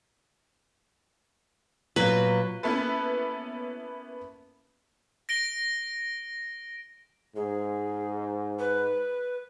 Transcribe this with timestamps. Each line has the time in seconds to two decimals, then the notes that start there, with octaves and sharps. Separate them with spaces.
1.96 A#2 F#3 B4
2.63 A#3 B3 C#4 E4 A4 B4
5.29 A#6 D7 G7
7.36 G#2 G#4
8.59 B4